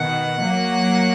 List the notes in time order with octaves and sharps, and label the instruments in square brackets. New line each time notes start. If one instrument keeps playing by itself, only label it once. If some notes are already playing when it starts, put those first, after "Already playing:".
Already playing: [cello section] B2 D#3 [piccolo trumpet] F#5
[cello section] F#3 A#3